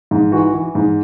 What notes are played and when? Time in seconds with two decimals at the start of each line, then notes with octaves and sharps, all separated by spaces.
0.11 G#2
0.32 E3 F#4
0.54 E3
0.75 G#2